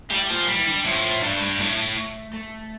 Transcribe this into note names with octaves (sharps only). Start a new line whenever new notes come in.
A2 G3
A#2 F3
G3
E3
D3
A2 F3
G2 A3
G3
A2 A3
A3